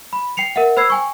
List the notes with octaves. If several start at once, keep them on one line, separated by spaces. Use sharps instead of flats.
B5
G5 C7 C#7 F7
A#4 E5 F#5
C5 B5 E6 G#6 C7
G5 G#5 C#6